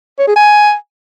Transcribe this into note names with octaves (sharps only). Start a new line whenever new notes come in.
C#5
G#4
G#5